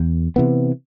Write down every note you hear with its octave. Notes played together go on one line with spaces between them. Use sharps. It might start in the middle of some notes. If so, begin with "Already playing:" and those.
Already playing: E2
C3 E3 B3